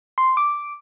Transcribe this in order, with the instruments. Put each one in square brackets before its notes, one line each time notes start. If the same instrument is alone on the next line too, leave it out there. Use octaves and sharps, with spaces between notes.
[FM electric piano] C6
D6